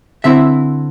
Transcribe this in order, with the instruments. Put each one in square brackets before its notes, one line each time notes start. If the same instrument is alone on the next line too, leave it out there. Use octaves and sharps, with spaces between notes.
[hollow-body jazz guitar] D3 C4 E4 E5